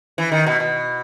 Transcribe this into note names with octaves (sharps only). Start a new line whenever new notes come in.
E3
D#3
B2
B2